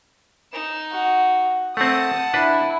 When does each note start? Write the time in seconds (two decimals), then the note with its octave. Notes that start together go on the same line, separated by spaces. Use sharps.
0.53 D#4 E7
0.93 F#4
1.77 A3 C4 F#5 A5 D#6
2.34 D4 E4 B4